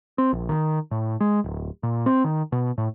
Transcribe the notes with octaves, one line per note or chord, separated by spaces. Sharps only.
C4
A#1
D#3
A2
G#3
D1
A#2
C4
D#3
B2
A2